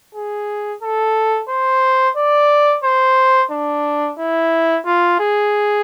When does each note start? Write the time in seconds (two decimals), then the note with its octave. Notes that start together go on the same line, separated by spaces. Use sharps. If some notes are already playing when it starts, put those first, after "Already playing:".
0.15 G#4
0.82 A4
1.49 C5
2.17 D5
2.84 C5
3.51 D4
4.19 E4
4.86 F4
5.20 G#4